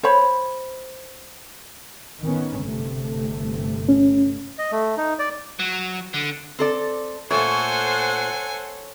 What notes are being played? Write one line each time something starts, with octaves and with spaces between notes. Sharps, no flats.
C5 C#5 B5
D#3 B3 C#4
G1 C3 A3
C#4
D#5
A3
D#4
D5
F#3
D3
C4 A4 D5
A#2 A3 A4 C5 C#5 F#5 G#5